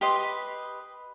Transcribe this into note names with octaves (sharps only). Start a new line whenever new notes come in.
G4 B4 D#5 C6